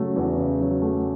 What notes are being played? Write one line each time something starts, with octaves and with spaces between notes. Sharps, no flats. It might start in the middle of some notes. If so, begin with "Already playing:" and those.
Already playing: C#3 F#3 A3
E2
C#3
F#3
A3